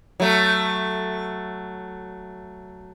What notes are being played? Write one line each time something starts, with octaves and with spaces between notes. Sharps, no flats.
F#3 A3